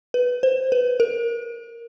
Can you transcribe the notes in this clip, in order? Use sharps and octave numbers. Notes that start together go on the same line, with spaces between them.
B4
C5
B4
A#4